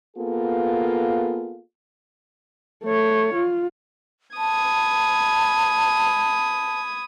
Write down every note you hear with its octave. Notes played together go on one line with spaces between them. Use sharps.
A#3 B3 F4 G#4 A4
A3 C#5
F4
A5 B5 D#6 G#6